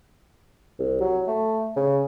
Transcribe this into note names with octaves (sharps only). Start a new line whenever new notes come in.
C2
F#3
A3
C#3